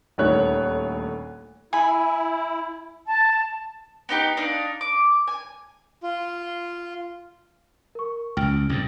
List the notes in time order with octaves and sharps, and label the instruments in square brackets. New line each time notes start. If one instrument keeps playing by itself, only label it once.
[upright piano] D#1 D2 D#3 C#5 F#6
[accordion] E4 [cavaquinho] G#5 B5
[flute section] A5
[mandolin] B3 D#4 G4
D4 D#4 F5
D6
G#5
[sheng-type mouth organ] F4
[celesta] A#4 C#6
[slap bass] C#2 [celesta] G5 F6 D7
[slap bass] C2 G#2